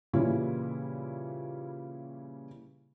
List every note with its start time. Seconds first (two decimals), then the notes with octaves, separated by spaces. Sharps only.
0.13 A#2 C#3 E3 G3 C#4 E4